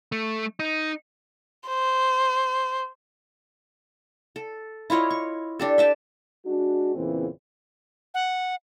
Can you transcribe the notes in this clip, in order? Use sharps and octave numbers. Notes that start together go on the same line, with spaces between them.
A3
D#4
C5
A4
E4 F4 C#5 D#5
C#6
D4 G4 A4
E5 G5 A5
G#3 D4 F#4
E2 A#2 C#3 E3 C4
F#5